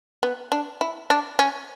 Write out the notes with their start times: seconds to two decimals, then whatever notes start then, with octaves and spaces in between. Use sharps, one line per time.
0.23 B3
0.52 D4
0.81 E4
1.10 D4
1.39 C#4